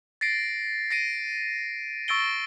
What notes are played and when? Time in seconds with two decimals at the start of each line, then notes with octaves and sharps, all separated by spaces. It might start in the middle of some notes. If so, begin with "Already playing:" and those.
0.21 A6 A#6 C7 D7
0.91 A#6 C7 D7 D#7
2.08 C#6 E6 A6 D7 G7